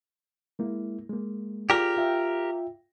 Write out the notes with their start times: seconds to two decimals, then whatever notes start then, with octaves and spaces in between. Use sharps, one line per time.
0.59 G#3 A#3 E4
1.10 G#3 A#3
1.70 F4 G4 G#4 A#4 D5
1.98 F4 E5 G5